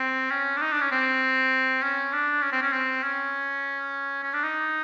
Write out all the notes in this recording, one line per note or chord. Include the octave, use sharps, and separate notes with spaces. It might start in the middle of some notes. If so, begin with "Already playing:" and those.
Already playing: C4
C#4
D4
D#4
D4
C#4
C4
C#4
D4
C#4
C4
C#4
C4
C#4
C#4
D4
D#4